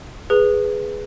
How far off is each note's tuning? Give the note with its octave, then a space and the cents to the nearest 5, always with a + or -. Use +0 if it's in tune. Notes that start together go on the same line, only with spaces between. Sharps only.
G#4 +0 B4 +0